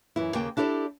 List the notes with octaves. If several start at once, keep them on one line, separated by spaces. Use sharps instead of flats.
F#2 E3 E4
D#2 C#3 A#3 G5
D4 E4 G4 A4 C#5 D5